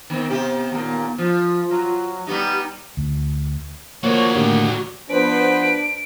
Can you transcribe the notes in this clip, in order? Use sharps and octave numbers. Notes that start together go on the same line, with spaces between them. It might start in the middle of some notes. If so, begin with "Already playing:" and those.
D#3 B3 C4
C3 G4
D#2 A#2
F3 F4
F#3
G3 B3 D#4 G4
D2
F3 A#3 F#4 C#5 D5 C#6
A2 D3 D#3 G4
F3 B3 D4 B4 C5 D7